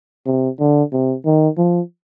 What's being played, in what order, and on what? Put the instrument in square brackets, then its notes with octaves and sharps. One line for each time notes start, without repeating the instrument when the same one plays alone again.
[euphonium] C3
D3
C3
D#3
F3